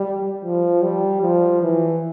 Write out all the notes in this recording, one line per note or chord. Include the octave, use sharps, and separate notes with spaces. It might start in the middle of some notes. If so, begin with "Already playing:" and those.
Already playing: G3
F3
G3
F3
E3